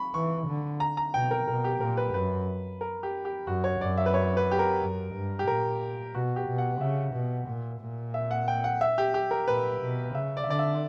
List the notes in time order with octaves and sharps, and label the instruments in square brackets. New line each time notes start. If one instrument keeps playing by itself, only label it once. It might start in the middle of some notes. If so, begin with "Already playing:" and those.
Already playing: [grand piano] B5 C#6
[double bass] E3 [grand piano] C#6
[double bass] D3
[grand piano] A#5
A#5
[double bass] B2 [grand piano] G5
[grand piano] A#4
[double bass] B2 [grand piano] A#4
[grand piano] G4
[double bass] A#2 [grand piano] A#4
[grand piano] B4
[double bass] F#2 [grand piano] B4
[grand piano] A#4
G4
G4
[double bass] F#2 [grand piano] F#4
[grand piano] C#5
[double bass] F#2 [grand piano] D5
[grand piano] E5
B4
C#5
B4
G4
A#4
[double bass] F#2
G2
[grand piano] G4
[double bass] A#2 [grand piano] A#4
[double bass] B2 [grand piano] F#4
[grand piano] G4
[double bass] B2
[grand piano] F#5
[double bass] C#3 [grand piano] E5
[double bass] B2
A#2
A#2
[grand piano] E5
F#5
G5
F#5
E5
G4
G4
A#4
[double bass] A#2 [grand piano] B4
[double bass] B2
[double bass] C#3 [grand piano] E5
[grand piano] D5
E5
[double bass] D3 [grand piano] D5
[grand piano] E5